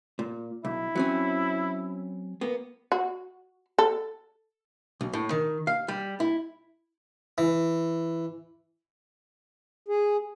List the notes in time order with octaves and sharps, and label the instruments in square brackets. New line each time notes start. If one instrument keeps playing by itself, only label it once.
[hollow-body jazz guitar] A#2
[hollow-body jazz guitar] B1 [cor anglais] E4
[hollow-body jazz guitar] F#3 C4 C#4
A#3 B3
[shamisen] F#4
A4
[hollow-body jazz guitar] B1
A2
D#3
F5
G3
E4
[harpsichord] E3
[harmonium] G#4